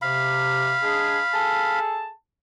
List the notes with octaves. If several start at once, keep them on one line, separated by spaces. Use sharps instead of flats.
C3 F5 B5
G#3 D4 G#4
G#4 A4 A5